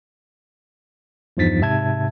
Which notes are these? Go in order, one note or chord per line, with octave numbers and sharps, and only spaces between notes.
E2 G2 F3 D#4 A6 B6
G#2 C3 E5 A5 G#6